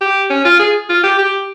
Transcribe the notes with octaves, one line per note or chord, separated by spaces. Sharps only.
G4
C#4
F4
G#4
F4
G4
G4